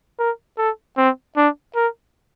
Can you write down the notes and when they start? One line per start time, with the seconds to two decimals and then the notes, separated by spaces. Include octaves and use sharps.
0.19 A#4
0.58 A4
0.97 C4
1.36 D4
1.75 A#4